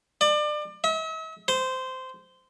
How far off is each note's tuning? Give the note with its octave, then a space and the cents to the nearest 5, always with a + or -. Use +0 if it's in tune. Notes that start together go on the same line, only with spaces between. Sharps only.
D5 +30
E5 -45
C5 -15